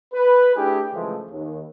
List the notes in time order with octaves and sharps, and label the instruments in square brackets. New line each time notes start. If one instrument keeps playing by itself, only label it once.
[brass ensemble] B4
A3 D4 E4 G4 G#4
C#3 E3 F3 G#3 A3
D#2